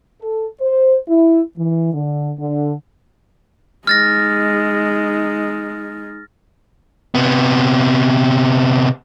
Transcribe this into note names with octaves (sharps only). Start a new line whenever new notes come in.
A4
C5
E4
E3
D3
D3
G#3 D#4 F6 A6 A#6
C3 B3